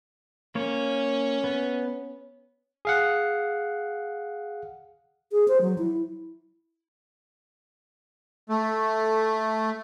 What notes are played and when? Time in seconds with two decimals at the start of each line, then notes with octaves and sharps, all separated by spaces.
0.55 A#3 C#4 C#5
1.44 B3
2.85 G#4 F5 F#5
5.32 G#4
5.48 C5
5.61 F#3
5.78 E4
8.49 A3